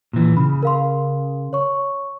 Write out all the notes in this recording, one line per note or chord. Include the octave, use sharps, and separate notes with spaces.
A#2 E3
C#3 B5
A#4 F5 C6
C#5 C#6